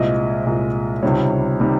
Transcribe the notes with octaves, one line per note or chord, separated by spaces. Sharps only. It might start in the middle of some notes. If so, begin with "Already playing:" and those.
Already playing: C2 A#2 G#3 D#5
C2 A#2 G#3
C#2 C3 D#3 G3 C#5
C3 D#3 G3